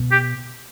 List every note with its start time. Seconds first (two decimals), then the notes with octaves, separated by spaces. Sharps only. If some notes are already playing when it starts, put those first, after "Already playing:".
Already playing: B2
0.12 G4